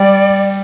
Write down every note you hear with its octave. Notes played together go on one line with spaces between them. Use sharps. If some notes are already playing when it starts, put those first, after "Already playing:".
Already playing: G3 D5